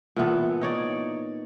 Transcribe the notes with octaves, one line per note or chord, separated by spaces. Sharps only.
A#2 E3 B3 A4
D#4 C#5 D5